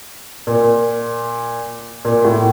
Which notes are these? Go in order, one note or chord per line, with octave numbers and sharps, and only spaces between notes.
A#2
A#2
A2